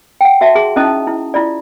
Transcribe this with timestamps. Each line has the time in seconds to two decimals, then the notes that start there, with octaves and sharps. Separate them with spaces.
0.21 F#5 G5
0.41 F#4 E5 A5
0.55 G#4 C6
0.76 C#4 D#4 E4 D#5 A5 D#6
1.07 E4
1.34 E4 F4 D5